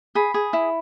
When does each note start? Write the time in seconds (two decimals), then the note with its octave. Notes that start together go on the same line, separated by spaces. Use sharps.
0.15 G#4 B5
0.34 G#4
0.53 E4